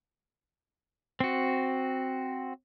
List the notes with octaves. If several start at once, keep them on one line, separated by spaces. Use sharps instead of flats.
C4 F#4